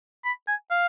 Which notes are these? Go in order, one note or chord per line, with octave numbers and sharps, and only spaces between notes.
B5
G#5
F5